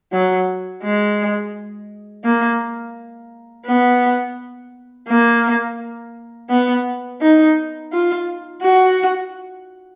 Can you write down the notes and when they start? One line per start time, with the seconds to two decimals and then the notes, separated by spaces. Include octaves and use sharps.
0.12 F#3
0.83 G#3
2.25 A#3
3.66 B3
5.08 A#3
6.50 B3
7.21 D#4
7.92 F4
8.62 F#4